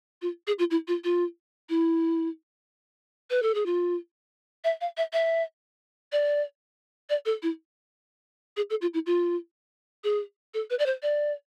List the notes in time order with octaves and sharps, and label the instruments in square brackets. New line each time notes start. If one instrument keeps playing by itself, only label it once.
[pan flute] F4
G#4
F4
E4
F4
F4
E4
B4
A4
G#4
F4
E5
F5
E5
E5
D5
D5
A4
E4
G#4
A4
F4
E4
F4
G#4
A4
B4
D5
C5
D5